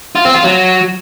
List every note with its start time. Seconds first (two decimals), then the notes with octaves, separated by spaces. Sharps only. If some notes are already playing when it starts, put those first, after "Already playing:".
0.15 F4
0.25 C4
0.34 F4
0.44 F#3